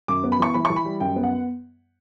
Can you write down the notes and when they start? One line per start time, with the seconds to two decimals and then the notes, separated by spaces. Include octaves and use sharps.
0.08 F#2 D6
0.24 B3
0.32 B5
0.40 E3 C#6
0.54 E3 B5
0.65 C#6
0.70 E3
0.76 B5
0.85 G3
1.00 F#2 G5
1.16 B3
1.24 F#5